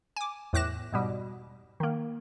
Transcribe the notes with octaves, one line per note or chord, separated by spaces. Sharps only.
G#5 D6
E2 A2 D6 F#6 A#6 E7
G#2 B2 G3
D#3 A#3